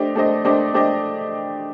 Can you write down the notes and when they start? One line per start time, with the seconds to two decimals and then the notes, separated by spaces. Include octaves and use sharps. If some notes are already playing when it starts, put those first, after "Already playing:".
Already playing: A3 D4 G4 C5 D#5
0.15 A3 D4 G4 C5 D#5
0.45 A3 D4 G4 C5 D#5
0.74 A3 D4 G4 C5 D#5